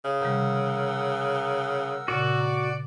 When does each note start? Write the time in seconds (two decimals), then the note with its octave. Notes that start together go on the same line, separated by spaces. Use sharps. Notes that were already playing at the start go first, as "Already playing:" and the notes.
0.05 C#3
0.21 C3 D#3 G3 A#4 F#5 E6
2.08 A#2 C#3 F#4 D5